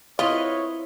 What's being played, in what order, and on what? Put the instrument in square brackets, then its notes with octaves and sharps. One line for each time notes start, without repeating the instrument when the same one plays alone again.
[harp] C4 E4 F6 [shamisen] F4 [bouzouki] B4 D#5 [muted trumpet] C#5